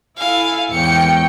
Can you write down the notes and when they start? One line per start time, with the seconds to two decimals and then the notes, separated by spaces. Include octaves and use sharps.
0.17 E4 A4 F5 G#5
0.71 E2 G#2 C#5 G5 C#7